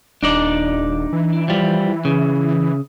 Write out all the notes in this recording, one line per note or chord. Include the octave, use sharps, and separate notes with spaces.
D#1 D4 D#4 D5
E3
F3 G3
C#3